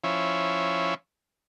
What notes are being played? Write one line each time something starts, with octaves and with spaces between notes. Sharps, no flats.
F3 C#4 E4